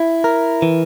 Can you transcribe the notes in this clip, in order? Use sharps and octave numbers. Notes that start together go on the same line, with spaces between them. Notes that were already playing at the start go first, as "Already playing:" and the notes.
Already playing: E4
A#4
E3